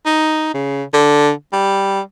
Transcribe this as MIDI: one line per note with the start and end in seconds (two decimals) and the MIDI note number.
0.06 0.54 63
0.55 0.83 49
0.94 1.30 50
1.53 2.00 55